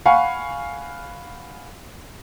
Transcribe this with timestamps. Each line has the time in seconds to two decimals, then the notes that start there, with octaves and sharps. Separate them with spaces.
0.06 F5 F#5 G#5 B5 C#6